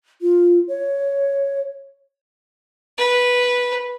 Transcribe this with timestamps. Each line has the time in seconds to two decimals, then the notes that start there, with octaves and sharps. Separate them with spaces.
0.22 F4
0.68 C#5
2.98 B4